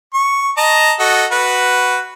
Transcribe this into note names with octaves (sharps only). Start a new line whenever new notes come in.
C#6
D#5 A5 A#5
F#4 A4 D#5
F#4 B4